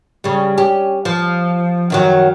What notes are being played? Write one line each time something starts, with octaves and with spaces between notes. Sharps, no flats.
C#3 G3
C#4 G4
F3
F#2 D#3 F#3